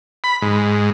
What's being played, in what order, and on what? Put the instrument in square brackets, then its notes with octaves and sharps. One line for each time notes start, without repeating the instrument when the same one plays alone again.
[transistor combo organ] B5
G#2